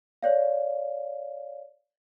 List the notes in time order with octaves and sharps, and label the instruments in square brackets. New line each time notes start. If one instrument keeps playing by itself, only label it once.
[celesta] C#5 D5 F5